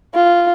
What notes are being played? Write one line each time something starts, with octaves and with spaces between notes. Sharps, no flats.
F4